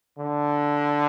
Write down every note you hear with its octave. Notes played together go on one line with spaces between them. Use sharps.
D3